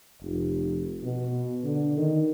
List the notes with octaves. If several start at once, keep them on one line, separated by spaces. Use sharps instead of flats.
F1
B2
D3
D#3